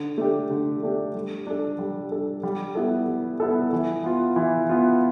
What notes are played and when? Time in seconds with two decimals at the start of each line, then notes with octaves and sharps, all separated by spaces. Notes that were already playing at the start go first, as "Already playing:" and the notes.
Already playing: D3
0.18 A3 D4 G4
0.51 D3
0.83 A3 D4 G4
1.14 G3
1.47 D4 A4
1.79 G3
2.11 D4 A4
2.43 G3
2.75 B3 E4 A4
3.08 G3
3.40 B3 E4 A4
3.73 E3
4.04 B3 F4
4.36 E3
4.69 B3 F4